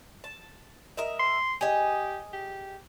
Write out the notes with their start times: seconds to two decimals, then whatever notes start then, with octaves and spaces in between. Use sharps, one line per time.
0.24 A5
0.97 A#4 D#5 E5
1.19 C6
1.61 G4 G#4 D#5
2.33 G4